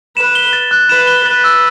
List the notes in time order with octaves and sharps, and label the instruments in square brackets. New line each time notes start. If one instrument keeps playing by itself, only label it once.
[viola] B4 [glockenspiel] E7
[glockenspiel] G7
A6
F#6
[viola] B4 [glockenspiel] E7
[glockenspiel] G7
[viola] B4 [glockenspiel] A6
[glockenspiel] E6